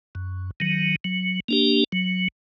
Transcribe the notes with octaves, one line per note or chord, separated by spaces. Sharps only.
F#2
D#3 F#3
F#3
A#3 D4 G4
F#3